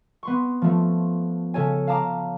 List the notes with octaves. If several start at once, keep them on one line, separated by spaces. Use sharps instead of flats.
B3 C6 C#6
F3 A3
C#3 A4 C#5 G#5
F5 A5 A#5 D6